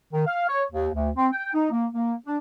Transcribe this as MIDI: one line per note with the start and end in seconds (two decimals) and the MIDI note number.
0.13 0.26 51
0.27 0.45 77
0.49 0.64 73
0.72 0.89 39
0.94 1.10 38
1.16 1.28 60
1.33 1.50 79
1.54 1.71 63
1.71 1.86 58
1.93 2.14 58
2.27 2.38 62